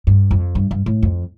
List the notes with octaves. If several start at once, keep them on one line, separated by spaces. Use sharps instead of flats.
G2
F2
G2
G2
A2
F2